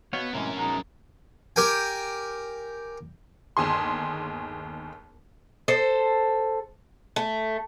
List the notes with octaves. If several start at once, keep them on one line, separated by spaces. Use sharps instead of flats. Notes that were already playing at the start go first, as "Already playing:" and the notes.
B2 B3 C#5 F5
A2 C3 E3 G#3 C#4 A#4
B2 G#3 D#4
G4 A#4 G5 G#5
G1 D#2 G#4 C6
A4 C5
A3